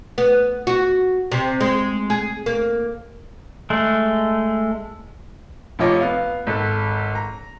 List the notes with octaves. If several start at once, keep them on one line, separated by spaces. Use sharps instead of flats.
B3
F#4
C3
G#3
G#4
A#3
G#3 A3
F1 F3 C#5 D#5 D6
B3 F5
G#1 A4
A#5